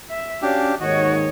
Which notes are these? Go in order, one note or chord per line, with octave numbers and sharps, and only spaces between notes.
E5
C#4 D4 F#4 G4 F5
D#2 G#2 D#3 F#4 C#5 D#5